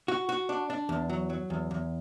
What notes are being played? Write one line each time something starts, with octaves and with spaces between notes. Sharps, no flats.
F#4
F#4
D4
D4
E2
F#3
F#3
E2
E2